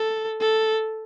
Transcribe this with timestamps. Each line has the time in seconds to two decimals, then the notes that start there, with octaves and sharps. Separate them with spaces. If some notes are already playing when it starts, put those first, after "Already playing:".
Already playing: A4
0.41 A4